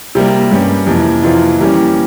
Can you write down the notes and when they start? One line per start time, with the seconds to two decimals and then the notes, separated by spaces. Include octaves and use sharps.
0.15 C3 G3 A#3
0.51 G2 G3 C#4
0.87 F2 C3 E3 A#3
1.23 F2 C3 E3 A#3 F4
1.59 E3 G3 A#3 C#4 G4